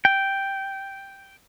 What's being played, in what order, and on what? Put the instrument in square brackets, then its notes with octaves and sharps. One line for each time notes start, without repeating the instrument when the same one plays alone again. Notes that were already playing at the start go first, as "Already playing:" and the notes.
[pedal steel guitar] G5